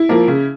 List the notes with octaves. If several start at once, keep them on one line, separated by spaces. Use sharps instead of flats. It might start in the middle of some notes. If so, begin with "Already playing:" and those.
Already playing: E4
F3 A#3
C#3